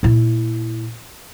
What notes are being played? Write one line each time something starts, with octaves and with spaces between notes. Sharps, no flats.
A#2 E4